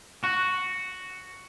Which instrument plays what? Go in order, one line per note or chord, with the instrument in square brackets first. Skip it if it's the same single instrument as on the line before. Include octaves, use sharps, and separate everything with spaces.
[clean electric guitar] F#4